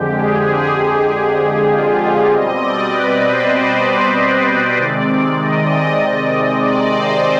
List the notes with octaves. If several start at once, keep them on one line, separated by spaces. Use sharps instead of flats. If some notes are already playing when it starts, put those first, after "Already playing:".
Already playing: F2 D3 G#3 G4
G#4
F4
B2 G3 C4 D#5
D5
B4
C5
D5
D5
D#5
C3 D#3 G#3 C4 D5
D#5
D5
C5